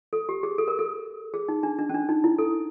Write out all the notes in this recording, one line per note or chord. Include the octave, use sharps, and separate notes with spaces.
A4
G4
G#4
A4
A#4
A4
G#4
D#4
D4
D4
C#4
D4
D#4
E4
A4